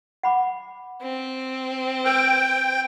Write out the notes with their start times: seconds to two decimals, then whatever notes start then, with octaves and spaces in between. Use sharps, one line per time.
0.23 F#5 B5 D6
1.03 C4
2.05 B4 G5 E6